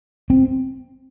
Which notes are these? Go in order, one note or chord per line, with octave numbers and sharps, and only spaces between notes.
C4